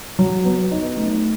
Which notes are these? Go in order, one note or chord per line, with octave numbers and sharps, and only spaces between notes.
F#3
B3
D#4
A3